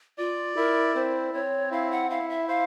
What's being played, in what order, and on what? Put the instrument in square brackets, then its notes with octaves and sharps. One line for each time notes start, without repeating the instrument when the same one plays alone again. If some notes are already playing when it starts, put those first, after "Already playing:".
[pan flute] F4 [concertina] D5
[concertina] E4 [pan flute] A#4
[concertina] C4 [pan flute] C5
[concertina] C4 [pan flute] C#5
[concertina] E4 [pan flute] F5
[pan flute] F#5
[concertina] E4 [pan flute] F5
[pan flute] E5
[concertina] C5 [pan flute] F5